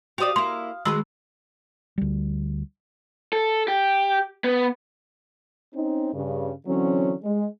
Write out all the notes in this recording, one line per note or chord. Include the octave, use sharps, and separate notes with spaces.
F#4 G4 C5 D5 F5 D#6
A#3 E4 C6
D#3 G#3 F#4 B4 B5 C6 E6
D2 G3
A4
G4
B3
C4 C#4 D#4
G2 C#3
D3 E3 F#3 C4 C#4
G#3